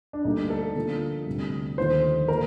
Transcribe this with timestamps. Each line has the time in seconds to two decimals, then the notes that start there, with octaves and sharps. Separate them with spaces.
0.13 D4
0.24 D2 D3 G3 A#3 D#4
0.50 A4
0.76 D3 F3 A#3 F4
1.26 D2 C3 G3
1.78 D#2 D3 F3 A3 D#4 C5
2.28 A#2 A3 D4 F4 A#4